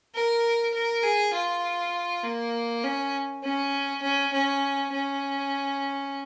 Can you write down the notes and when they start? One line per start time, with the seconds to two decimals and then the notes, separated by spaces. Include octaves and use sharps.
0.15 A#4
0.74 A#4
1.04 G#4
1.34 F4
2.24 A#3
2.84 C#4
3.44 C#4
4.03 C#4
4.34 C#4
4.93 C#4